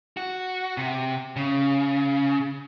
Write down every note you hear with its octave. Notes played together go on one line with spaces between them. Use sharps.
F#4
C3
C#3